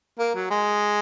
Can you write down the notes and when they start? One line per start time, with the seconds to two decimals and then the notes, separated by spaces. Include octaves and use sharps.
0.19 A#3
0.35 F#3
0.50 G#3